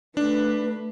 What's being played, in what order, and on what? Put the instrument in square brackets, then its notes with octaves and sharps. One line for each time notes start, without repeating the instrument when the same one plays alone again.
[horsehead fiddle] A3 B4 [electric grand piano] D4